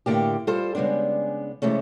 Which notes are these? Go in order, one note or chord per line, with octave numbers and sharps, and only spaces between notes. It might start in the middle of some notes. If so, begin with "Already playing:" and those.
A2 D3 A#3 G4
G3 F4 A4 C5
C#3 G3 G#3 B3 D4
C3 E3 G#3 A3 C#4